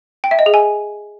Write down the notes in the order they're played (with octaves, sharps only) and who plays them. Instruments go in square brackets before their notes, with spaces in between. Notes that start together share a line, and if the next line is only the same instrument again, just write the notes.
[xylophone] G5
E5
D#5
G#4
G#5